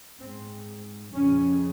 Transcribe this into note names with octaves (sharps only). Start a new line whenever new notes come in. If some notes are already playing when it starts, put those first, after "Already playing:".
G#2 C4
F2 C#3 C#4